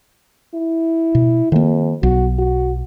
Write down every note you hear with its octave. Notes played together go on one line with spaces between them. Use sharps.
E4
B2
F2 D#3 A#3
B1 F#4
F#4